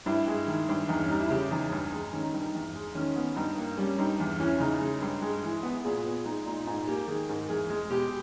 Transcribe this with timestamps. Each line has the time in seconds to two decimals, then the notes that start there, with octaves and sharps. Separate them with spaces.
0.06 G2 E4
0.27 G#3
0.47 D#3
0.68 G2
0.89 E2 D#4
1.00 C#4
1.10 G3 D#4
1.20 E4
1.30 C#3 G4
1.51 E2 D#4
1.72 G2
1.93 G#3
2.13 D#3 C#4
2.23 D#4
2.33 G2
2.43 D#4
2.54 E2
2.75 G#3
2.95 D#3 C#4
3.16 B3
3.36 G2 D#4
3.57 A#3
3.78 G3 C#4
3.98 G2 D#4
4.20 E2
4.40 E3 C#4
4.60 C#3 D#4
4.81 G#3
5.01 G2
5.22 G#3
5.43 E3
5.63 B3
5.84 A#2 G#4
6.04 B3
6.25 G#3 D#4
6.45 A#2 D#4
6.67 G#2 D#4
6.87 A#3 G4
7.07 D#3 G#4
7.29 G#2 A#4
7.49 E2 G#4
7.70 G#3
7.90 B2 G4